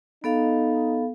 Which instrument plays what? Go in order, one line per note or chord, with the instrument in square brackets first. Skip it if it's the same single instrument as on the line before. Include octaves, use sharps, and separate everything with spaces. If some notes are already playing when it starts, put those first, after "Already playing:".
[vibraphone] B3 A4 F5 [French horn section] D#4